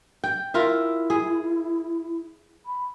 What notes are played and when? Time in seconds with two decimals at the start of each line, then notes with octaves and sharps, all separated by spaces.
0.24 G5
0.54 E4 F4 A#4 E5
1.10 G#4
2.66 B5